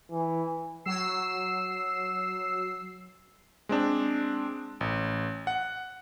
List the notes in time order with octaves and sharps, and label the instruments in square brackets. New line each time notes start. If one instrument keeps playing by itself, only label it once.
[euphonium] E3
[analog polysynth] F#3 E6 C7
[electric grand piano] G#3 C4 D4
A1
F#5